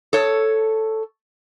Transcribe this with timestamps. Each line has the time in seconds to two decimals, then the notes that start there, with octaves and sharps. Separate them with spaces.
0.13 A4 C#5